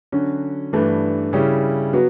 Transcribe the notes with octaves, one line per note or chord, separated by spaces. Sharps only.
D3 F#3 C#4 F#4
G2 E3 A3 D4
C#3 G3 C#4 E4
F#3 B3 F#4